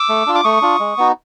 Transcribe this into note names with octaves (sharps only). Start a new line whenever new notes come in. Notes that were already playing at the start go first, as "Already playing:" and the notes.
Already playing: D6 E6
A3
D4 F4
D6
A3 C#6 D#6
D4 F4
G#3
B3 D#4 F#4